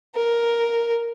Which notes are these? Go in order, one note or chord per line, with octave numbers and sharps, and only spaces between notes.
A#4